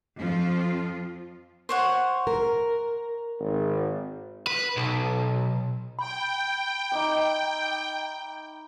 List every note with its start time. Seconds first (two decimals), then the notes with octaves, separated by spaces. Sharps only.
0.17 F2 F3 C4 F4
1.69 C5 C#5 F#5
2.27 A#4
3.40 G#1
4.47 B4
4.77 B1
5.99 G5 B5
6.92 D#4 E5 D6